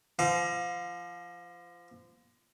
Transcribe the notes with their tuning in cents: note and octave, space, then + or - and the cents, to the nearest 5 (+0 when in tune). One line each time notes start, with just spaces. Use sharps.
F3 -30 F5 +30